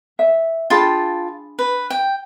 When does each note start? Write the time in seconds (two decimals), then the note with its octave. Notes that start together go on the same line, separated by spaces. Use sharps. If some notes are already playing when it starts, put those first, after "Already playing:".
0.19 E5
0.70 D4 F4 G#4 G5 A5 B5
1.59 B4
1.90 G5